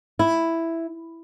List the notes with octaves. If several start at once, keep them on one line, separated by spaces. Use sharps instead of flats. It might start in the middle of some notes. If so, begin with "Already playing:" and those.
E4